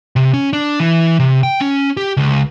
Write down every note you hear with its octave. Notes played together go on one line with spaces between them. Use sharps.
C3
C#4
D4
E3
C3
G5
C#4
G4
C#2